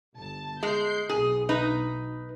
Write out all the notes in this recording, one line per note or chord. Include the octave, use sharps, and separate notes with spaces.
G1 A5
G#3 G6 C7
B1 B2 G#4
D#4 B4